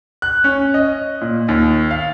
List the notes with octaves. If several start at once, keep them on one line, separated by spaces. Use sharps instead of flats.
F#6
C#4
D#5
A#2
D#2
F5